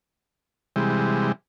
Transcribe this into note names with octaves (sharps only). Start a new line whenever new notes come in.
C3 E3 G3 G#3